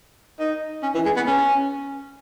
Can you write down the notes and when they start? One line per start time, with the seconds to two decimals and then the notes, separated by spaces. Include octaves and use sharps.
0.39 D#4
0.83 C#4
0.94 E3
1.05 G#3
1.16 B3
1.27 C#4